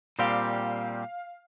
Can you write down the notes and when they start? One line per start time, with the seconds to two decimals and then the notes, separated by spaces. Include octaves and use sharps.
0.19 A#2 G3 C4 G4 F5